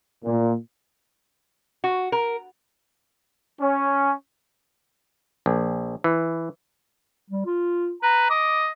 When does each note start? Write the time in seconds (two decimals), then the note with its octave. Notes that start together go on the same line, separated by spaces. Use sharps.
0.24 A#2
1.84 F#4
2.12 A#4
3.60 C#4
5.46 A#1
6.04 E3
7.30 G3
7.46 F4
8.03 B4 A#5
8.30 D#5 D6